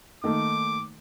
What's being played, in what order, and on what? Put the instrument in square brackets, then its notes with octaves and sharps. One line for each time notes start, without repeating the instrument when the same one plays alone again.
[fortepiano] D#3 A3 A#3 [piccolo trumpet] D6